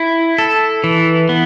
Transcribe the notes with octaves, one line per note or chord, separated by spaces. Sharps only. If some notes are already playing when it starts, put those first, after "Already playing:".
Already playing: E4
A4
E3
B3